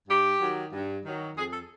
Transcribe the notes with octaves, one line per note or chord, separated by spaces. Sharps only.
G2 G4
D#3 F#3
G2
D#3 F#3
F2 G#4
A4